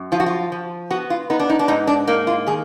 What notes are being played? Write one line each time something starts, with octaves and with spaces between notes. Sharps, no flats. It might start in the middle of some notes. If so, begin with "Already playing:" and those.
Already playing: F#2
F3 F4
F#4
F4
F3
B3 F#4
F4
B3 D#4
D4
D#4
D4
G#2 D#4
D4
A#3 D#4
F4
D#3 G#4